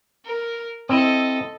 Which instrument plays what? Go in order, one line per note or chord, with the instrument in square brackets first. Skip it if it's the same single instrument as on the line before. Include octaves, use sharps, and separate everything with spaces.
[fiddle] A#4
[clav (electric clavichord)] C4 E4 [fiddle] A4 D#5